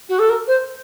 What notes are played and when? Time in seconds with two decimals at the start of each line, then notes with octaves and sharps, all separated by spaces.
0.08 F#4
0.19 A4
0.29 A#4
0.47 C5